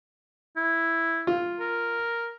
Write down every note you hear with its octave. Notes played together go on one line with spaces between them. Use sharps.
E4
F4
A#4